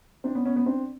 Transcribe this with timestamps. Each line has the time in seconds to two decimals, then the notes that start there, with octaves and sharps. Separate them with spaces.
0.24 C4 D4
0.35 B3 C#4
0.45 B3 C#4
0.56 B3 C#4
0.66 C4 D4